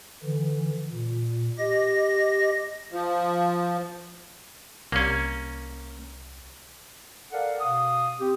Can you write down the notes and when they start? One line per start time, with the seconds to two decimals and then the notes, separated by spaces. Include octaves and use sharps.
0.24 D3 E3
0.91 A#2
1.58 G4 D#5 A#6
2.92 F3
4.92 C2 A#3 C#4
7.32 A4 A#4 D5 F5 F#5
7.60 B2 F5 D#6
8.20 C4 G4